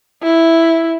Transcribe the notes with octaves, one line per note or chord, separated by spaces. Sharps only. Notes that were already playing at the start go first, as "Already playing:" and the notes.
E4